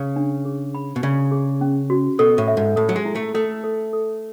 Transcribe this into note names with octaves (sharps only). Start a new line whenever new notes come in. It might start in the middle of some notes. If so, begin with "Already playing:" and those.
Already playing: C#3
D4
G#4
B5
B2
C#3 D5
G#4
C#4
F#4
B2 A4
A2
E5
G#2
A2 A4
F#3
G#3
E4
A3
A3 A4
A4
A4